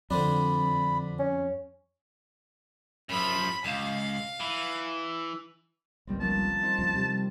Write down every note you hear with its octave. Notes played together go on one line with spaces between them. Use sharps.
F2 D3 C4 D4 B5
C#4
F#2 F3 B5
C#2 F5
E3
G#1 C#2 D#3 G3 B3 C4
F3 A#3 C#4 A5
C4 D#4 C5
D#2 C#3 F3
C3 G3 G4